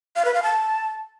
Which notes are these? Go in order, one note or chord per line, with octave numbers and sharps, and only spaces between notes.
F5
B4
F5
A5